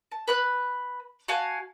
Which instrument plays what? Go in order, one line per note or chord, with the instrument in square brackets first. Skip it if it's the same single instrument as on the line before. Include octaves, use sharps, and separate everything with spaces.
[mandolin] A5
B4 B5 F#6
F#4 F5 G#5 A5